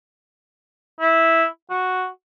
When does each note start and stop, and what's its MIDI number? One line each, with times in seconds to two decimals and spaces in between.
1.00 1.45 64
1.70 2.07 66